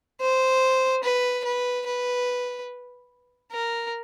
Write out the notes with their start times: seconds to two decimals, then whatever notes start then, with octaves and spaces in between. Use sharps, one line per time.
0.21 C5
1.04 B4
1.45 B4
1.87 B4
3.52 A#4